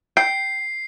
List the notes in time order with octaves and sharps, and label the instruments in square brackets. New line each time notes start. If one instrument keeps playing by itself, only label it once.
[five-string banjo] G5 [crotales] C7